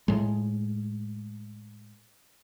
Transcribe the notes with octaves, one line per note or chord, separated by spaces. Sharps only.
A2 G#3